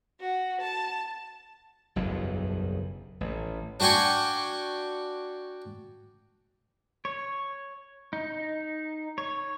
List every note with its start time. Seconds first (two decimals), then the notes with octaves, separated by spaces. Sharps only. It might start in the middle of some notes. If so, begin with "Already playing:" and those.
0.20 F#4
0.60 A5
1.96 F#1 B1 E2 G2
3.21 A1
3.80 D4 F#4 G5 G#5 C#6
7.05 C#5
8.13 D#4
9.18 C#5